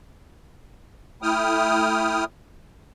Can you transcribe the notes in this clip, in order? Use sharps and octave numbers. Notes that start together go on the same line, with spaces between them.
A3 E4 G5 D#6 F6